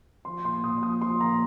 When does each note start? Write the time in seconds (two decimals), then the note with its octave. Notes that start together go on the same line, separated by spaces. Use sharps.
0.25 F3 C6
0.44 A#2 C6
0.63 A#2 D#6
0.82 F3 D#6
1.02 F3 C6
1.21 A#2 A#5